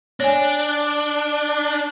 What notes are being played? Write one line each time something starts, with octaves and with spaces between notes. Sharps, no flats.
D4 C#5 G#5